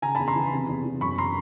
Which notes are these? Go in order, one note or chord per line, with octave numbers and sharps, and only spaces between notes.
C#3 G#5 A#5
E2 A5 B5
A#5 C6
E3
C3
E2
E3
F#2 B5 C#6
A#5 C6